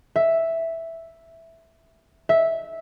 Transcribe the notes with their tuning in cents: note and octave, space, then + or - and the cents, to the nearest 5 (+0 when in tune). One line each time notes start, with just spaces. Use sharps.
E5 +0
E5 -10